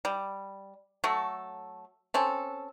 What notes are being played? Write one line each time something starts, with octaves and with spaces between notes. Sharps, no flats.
G3
F#3 A3 A4
C4 C#4 A4